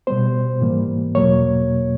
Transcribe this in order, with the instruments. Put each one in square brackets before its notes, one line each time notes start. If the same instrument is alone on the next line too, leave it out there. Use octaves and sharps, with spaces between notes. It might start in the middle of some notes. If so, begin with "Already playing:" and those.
[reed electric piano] B2 G3 B3 C5
G#2 E3 G3 A#3
E2 B2 F#3 A#3 C#5